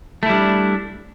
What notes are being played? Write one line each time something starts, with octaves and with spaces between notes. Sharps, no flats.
G3 A3 D4 E4